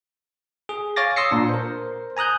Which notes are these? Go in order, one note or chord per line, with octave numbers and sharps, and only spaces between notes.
G#4
C#5 F5 G#5 D6 A6 A#6
C6 D#6 E6 A#6 C7 C#7
A#2 D4
A#4 C5
G#5 A#5 D#6 F#6 G6